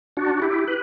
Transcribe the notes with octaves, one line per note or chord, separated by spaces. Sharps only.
D4 F#4
E4 G4
B4